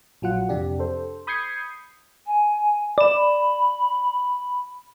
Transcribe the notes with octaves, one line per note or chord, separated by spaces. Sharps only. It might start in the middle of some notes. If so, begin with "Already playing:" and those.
A#1 F#3 F4 F#5
F2 C3 D4 G4
A4 C5
B5 D#6 G6 G#6 C7 C#7
G#5
D5 B5 E7